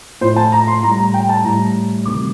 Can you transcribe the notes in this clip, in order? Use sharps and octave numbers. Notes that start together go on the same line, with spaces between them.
A2 F3 C5
A5
A#5
C6
A2 G3 A#5
A#5
G5
A5
A2 G3 A#5
D2 C3 D#3 G3 D6